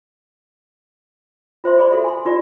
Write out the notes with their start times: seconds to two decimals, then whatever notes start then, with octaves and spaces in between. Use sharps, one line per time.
1.64 F4 C5 E5 C6
1.78 G#4 D5 B5 C6
1.91 F#4 A4 E5 C6
2.04 G#5 C6
2.25 D#4 F4 G4 D5